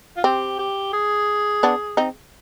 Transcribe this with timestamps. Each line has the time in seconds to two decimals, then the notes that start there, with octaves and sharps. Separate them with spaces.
0.17 F4
0.24 C4 G4
0.59 G4
0.93 G#4
1.63 B3 D4
1.97 C4 D#4